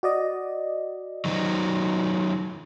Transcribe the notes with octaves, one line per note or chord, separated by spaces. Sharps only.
F#4 D5 D#5
D#3 F#3